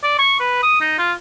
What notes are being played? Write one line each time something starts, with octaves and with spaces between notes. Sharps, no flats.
D5
C#6
B4
D#6
D#4
F4